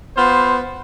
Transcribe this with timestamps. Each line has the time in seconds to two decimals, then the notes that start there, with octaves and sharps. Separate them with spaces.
0.17 B3 F4 C5